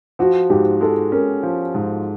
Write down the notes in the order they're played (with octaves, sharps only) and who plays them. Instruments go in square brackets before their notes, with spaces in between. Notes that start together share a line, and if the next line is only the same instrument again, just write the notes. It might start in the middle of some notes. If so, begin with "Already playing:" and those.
[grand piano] F3 [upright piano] F#4
[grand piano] G#2 [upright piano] G4
[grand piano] G#3 [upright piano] A4
[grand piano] C#4 [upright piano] A#4
[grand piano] F3
G#2